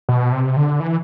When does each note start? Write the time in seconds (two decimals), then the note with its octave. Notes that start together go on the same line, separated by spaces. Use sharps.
0.09 B2
0.32 C3
0.57 D3
0.80 E3